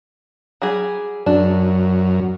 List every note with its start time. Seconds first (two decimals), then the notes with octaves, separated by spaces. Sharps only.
0.62 F#3 G3 G#4
1.26 F#2 D4